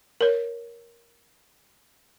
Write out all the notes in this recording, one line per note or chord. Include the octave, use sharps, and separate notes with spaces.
A#4 C#5